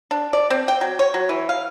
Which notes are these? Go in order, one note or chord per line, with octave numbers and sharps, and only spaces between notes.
D4
D5
C4
G5
F#3
C#5
F#3
E3
F5